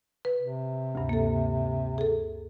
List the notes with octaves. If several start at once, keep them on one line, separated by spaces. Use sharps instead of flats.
B4
C3
D2 G2
A#3 A4
G#4 A4